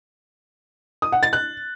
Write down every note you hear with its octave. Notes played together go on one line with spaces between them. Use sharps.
D#6
F#5
A6
F#6